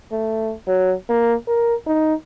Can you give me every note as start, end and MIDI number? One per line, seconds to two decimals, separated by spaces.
0.12 0.53 57
0.67 0.94 54
1.09 1.34 58
1.47 1.75 70
1.86 2.14 63